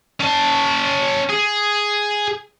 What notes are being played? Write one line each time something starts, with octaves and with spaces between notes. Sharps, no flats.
C#4 A5
G#4